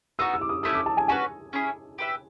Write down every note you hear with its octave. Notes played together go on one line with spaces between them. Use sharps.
B3 D#4 F#4 E6
E6
D6
D#6
A3 C#4 E4 A4 D#6
D6
A5
G#5
C#4 F#4 B4 G#5
C#4 E4 G#4
G4 B4 E5